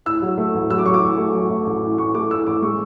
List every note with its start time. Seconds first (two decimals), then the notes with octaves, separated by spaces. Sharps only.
0.06 A2 E6
0.22 F#3
0.38 A3
0.55 A1
0.70 F#3 E6
0.78 D6
0.86 F#3 C#6
0.94 D6
1.02 A2
1.18 A3
1.35 F#3
1.50 A3
1.67 A1
1.83 A2
1.98 A2 C#6
2.15 A3 D6
2.30 A2 E6
2.46 A1 D6
2.62 G#3 C#6